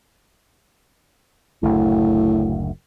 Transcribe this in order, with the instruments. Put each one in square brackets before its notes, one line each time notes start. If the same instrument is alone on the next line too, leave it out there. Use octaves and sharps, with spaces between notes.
[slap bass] F#1 D2 [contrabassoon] A2